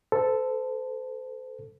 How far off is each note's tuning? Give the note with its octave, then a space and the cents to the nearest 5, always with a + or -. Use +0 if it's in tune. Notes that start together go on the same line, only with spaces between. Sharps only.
A4 +0 C5 -35